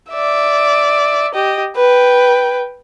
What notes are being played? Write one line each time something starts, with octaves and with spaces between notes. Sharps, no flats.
D5 E5
G4 D#5
B4 G5